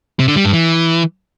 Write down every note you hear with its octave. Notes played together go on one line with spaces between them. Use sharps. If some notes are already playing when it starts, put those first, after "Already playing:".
C3
D3
G3
G2
E3